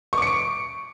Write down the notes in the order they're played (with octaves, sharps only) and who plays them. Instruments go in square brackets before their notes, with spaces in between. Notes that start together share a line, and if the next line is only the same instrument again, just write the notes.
[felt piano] C#6
D6
C#7
D7